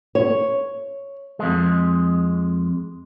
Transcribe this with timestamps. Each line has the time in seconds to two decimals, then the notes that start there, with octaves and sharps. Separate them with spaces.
0.15 C#5
1.39 F2 G#3